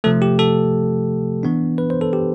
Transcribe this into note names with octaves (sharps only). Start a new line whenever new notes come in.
C3 F3 A3 A4
G4
A4
E3 B3 D4
B4
C5
A4
G4